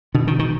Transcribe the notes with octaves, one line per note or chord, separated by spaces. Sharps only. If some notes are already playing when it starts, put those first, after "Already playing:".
B2 D3
D#3
D#3